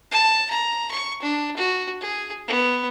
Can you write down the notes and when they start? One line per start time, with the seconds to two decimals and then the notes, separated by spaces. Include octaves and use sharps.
0.12 A5
0.50 A#5
0.91 C#6
1.22 D4
1.57 F#4
2.01 G#4
2.47 B3